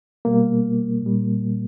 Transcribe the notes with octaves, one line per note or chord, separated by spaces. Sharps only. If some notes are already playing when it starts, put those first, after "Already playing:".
B2 G3 A#3
A#2 G3